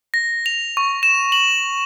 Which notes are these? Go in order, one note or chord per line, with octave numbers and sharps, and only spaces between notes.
A#6
F7
C#6
E7
F#7